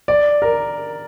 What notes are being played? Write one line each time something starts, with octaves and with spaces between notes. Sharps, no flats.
D5
A#4